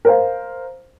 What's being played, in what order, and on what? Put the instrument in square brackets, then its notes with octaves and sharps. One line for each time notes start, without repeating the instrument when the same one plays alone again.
[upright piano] A#4 C5 F5